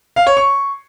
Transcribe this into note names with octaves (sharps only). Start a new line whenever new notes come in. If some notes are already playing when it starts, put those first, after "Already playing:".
F5
C#5
C#6